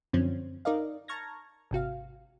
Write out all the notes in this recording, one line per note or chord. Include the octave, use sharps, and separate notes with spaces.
F#2 D3 F3 C4 C#4
D#4 A#4 D5 D#5 F5
A5 A#5 C#6 F6 G#6 A#6
G#1 C3 F#4 F5